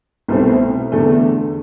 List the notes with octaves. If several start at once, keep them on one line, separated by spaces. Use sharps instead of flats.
C2 B2 A3 C4
E2 D3 A3